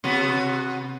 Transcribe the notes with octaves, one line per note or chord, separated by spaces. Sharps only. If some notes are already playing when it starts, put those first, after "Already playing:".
C3 B3 F#4